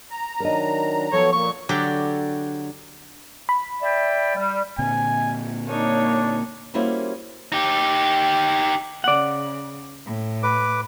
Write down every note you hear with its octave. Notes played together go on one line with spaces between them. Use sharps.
A#5
D#3 F#3 D4 A#4 D#5
F3 F#3 B3 A4 C#5
A#2 A#3 C#6
D3 F#3 G4 D5
B5
D5 E5 G5
G3
A#2 D3 C4 G#5
A#3 D4 D#4 C#5
G3 A#3 C#4 E4 F#4 C5
D#4 G4
C#3 D5 F#5
A2
B4 D6